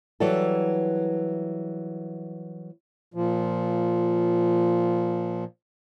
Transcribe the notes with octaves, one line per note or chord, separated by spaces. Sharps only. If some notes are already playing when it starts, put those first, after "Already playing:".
E3 F#3 G3 A4
A#2 F3